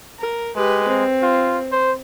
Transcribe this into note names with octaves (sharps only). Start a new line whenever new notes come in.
A#4
G#3 G4 B4
C4
F4
C5